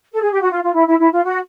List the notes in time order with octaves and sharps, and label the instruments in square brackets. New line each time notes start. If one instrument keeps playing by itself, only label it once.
[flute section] A4
G#4
G4
F#4
F4
F4
E4
E4
E4
F4
F#4